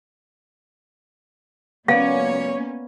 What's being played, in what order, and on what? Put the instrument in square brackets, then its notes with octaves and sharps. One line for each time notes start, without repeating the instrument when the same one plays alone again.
[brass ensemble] C#2 F#3 C#5 [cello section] A#3 C#4 [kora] B3 D5 [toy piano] F5